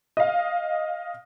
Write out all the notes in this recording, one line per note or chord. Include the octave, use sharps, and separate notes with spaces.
D#5 F5